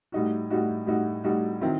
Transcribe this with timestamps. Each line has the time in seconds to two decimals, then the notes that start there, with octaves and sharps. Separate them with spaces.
0.12 A2 G3 D#4 F#4
0.50 A2 G3 D#4 F#4
0.87 A2 G3 D#4 F#4
1.24 A2 G3 D#4 F#4
1.61 D#3 F#3 C4 E4